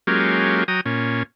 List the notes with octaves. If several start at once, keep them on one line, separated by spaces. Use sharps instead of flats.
F#3 G#3 A#3 C#4 F4 G4
F#3 G5 A#5 D#6
A#2 C#4